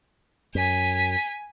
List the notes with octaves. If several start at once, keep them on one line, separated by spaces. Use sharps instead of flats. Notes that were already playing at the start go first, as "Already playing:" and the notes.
F#2 G#5 B6